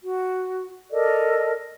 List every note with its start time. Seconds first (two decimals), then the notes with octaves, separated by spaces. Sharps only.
0.03 F#4
0.90 A4 A#4 D5 D#5